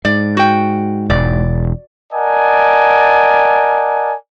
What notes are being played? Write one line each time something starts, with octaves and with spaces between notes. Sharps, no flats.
G#2 D5
F#4 G5
E1 D5
A#4 D5 D#5 F#5 G#5 A5